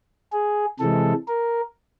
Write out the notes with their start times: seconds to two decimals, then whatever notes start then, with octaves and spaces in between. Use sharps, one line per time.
0.32 G#4
0.80 C3 E3 G#3 A4
1.28 A#4